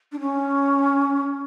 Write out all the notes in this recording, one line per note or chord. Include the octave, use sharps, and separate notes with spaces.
D4
C#4